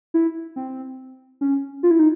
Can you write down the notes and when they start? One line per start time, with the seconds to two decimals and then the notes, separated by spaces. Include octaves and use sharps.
0.14 E4
0.56 C4
1.41 C#4
1.83 F4
1.91 E4
1.99 D#4